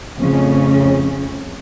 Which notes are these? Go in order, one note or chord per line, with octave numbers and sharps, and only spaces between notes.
F2 A2 C#3 C#4